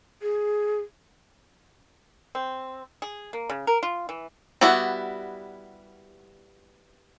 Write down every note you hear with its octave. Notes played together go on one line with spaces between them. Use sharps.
G#4
C4
G#4
A#3
C#3
A#4
F4
E3
G3 B3 E4 F#4